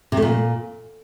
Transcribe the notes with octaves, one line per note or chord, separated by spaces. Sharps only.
C3
A3
A#2